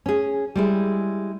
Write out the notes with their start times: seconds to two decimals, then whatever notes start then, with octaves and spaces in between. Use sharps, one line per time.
0.06 C#4 G#4
0.56 G3 G#3 E4